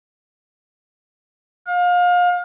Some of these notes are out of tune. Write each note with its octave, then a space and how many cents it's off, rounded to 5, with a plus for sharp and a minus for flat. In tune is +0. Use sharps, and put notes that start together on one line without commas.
F5 +30